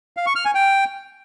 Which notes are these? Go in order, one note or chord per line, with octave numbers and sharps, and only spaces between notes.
F5
C#6
F6
G#5
G5